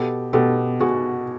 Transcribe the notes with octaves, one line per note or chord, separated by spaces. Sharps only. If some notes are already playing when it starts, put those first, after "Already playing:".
Already playing: B2 G4 A4
B2 G4 A4
B2 F#4 G#4